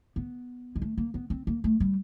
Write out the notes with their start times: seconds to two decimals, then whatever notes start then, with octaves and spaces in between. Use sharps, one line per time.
0.16 B3
0.76 G#3
0.82 A3
0.98 A#3
1.14 B3
1.30 C4
1.47 A#3
1.64 A3
1.80 G3